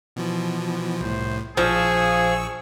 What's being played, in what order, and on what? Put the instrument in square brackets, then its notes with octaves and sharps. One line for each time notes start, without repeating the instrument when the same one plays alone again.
[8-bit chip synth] B2 E3 F3
[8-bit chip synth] C2 A2 [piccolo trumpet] C5
[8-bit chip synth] A#1 C#6 E6 [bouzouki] F3 [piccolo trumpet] G#4